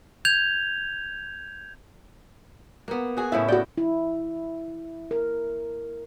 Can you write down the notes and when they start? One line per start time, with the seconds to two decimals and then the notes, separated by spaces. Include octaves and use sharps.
0.25 G6 G#6 F7
2.88 A#3 B3
3.17 F#4 G#4
3.32 A2 C#3 E4 E5
3.48 F#4 D5 G5
3.78 E4
5.11 A#4